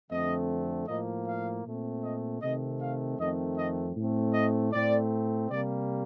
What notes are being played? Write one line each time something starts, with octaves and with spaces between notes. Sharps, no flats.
F2 D3 A3 C4 D#5
A2 F3 A#3 D#5
F5
A#2 A3 C4
D#5
C3 D#3 A3 C4 D#5
F5
F2 D#3 A3 C4 D#5
D#5
A2 A3 C4
D#5
A2 A3 C4 D5
C3 G3 A#3 D5